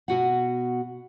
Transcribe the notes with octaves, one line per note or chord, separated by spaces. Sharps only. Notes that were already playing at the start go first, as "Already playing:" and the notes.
B2 F#4 F#5